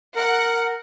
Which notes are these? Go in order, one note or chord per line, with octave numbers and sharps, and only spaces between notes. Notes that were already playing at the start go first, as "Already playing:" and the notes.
A#4 F#5